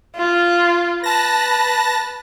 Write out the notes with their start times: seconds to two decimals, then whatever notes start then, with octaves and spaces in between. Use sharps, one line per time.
0.16 F4
1.04 B4 A5 A#6